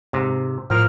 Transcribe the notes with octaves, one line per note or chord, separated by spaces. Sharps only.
G#2 C3
A2 F3 A#4 F6